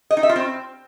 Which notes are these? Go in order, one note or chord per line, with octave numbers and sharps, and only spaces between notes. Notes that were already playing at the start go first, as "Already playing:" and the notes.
D#5
D#4
E5
F4
C4